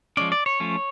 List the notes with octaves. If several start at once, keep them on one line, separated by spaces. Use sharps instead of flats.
F3 G#3 C#4 D5
D5
C#5
F3 A3 C#4